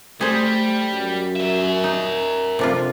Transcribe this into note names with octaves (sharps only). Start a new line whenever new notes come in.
G3 A3 G#4 C5
F#2
A#4 E5
D#4
F2 C3 D4 F4